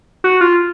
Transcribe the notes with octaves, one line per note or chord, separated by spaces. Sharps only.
F#4
F4